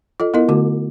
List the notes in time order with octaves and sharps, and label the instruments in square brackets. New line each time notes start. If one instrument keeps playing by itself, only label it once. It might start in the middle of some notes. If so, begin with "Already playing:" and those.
[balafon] F4 A4 D#5
B3 E4 A#4 D#5
D3 A3 F#4 D6